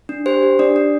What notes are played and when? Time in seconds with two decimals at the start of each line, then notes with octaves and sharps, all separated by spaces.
0.09 D4
0.26 G4 C5
0.43 G4
0.59 D4 D5
0.76 D4